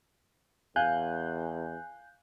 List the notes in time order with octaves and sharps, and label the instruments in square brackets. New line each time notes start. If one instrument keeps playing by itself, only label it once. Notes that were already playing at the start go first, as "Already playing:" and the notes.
[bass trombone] E2 [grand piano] F5 [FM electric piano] G#5 F#6 G6